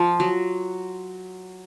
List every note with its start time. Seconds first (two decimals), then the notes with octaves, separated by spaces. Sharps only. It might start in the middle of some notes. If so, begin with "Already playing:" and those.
Already playing: F3
0.20 F#3